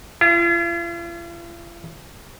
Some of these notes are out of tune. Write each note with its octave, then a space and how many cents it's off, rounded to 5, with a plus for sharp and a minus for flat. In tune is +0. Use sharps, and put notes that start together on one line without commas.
F4 -45